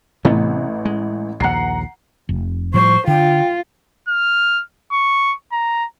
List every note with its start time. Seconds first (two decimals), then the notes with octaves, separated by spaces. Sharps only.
0.25 A1 C3 E3 A3 B3
0.85 G#3
1.40 A#1 D#2 F#5 A#5 C7
2.29 F1
2.74 A2 F3 G3 C5 C#6
3.07 D3 F4 G5
4.09 F6
4.92 C#6
5.52 A#5